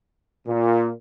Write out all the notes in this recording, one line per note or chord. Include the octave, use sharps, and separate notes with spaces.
A#2